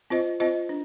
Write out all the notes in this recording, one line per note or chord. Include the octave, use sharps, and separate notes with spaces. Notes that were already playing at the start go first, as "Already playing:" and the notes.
C4 F4 C5 D#5
C4 F4 C5 D#5
D4